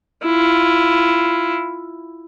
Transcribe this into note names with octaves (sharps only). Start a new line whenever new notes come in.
E4 F4